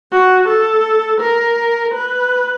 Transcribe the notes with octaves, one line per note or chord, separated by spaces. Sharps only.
F#4
A4
A#4
B4